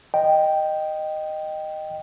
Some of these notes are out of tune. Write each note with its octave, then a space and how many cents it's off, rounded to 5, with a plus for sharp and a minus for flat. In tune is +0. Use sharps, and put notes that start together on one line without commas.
D#5 -10 G5 -5